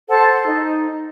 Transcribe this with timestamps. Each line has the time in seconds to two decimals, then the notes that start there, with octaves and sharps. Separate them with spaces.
0.08 A4 C5 F#5 A5
0.47 D#4